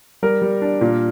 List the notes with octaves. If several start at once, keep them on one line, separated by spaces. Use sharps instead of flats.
G3 A#4
G3
D4
A#2